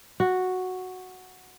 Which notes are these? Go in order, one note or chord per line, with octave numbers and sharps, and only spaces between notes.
F#4